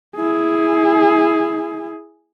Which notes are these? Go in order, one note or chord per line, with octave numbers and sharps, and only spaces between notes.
E4 G#4